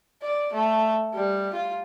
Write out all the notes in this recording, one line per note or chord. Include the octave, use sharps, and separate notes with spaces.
D5
A3
G3
F4